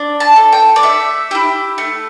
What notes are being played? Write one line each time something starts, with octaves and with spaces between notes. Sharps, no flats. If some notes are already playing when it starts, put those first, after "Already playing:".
Already playing: D4
A5
A4
G5
D5
A3 E5
E4 G4
A3